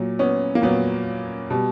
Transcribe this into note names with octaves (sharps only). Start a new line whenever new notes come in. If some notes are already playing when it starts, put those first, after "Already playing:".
Already playing: A#2 F#3
B3 C#4
A#3
A#2 F#3 B3
B2 G3